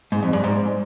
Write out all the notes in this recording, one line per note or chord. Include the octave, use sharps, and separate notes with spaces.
G#2
F2
G2
G#2